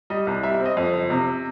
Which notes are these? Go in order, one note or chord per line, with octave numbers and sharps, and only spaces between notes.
G3 D#5
C2
G3 E5
E5
C4
D#5
F2
F#1
C3